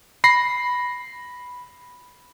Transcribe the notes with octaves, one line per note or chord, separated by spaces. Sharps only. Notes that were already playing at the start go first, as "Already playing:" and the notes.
B5 A#6 C7